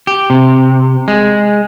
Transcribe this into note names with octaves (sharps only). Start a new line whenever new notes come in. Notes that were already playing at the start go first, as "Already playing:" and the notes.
G4
C3
G#3